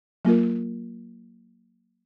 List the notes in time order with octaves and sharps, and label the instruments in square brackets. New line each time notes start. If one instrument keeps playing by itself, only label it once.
[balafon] F#3 A#3 F4 A#4